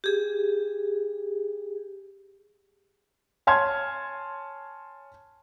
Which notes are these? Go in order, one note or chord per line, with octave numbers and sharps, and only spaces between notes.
G4 G#4
C#5 G#5 A5 C6 F6 G#6